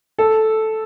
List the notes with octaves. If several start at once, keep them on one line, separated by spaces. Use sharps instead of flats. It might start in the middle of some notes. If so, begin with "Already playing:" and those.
A4